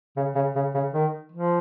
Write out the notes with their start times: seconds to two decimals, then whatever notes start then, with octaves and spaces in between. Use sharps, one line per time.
0.17 C#3
0.35 C#3
0.56 C#3
0.75 C#3
0.93 D#3
1.32 F3